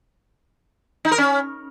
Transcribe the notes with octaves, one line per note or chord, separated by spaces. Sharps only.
D#4
A#4
C#4